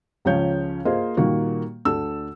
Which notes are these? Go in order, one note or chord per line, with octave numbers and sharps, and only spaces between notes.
C#2 C#3 F3 C#4 C#5 G6
A#3 F4 G#4 C5 D#5
A#2 D#3 G3 A#3 F#4
D2 D4 A4 E6